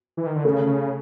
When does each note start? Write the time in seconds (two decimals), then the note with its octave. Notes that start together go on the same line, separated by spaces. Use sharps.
0.17 E3
0.26 D#3
0.36 D3
0.44 C#3 A3 A4
0.66 C#3